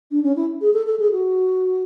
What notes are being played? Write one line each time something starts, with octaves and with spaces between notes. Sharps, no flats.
D4
C#4
E4
G#4
A4
A4
G#4
F#4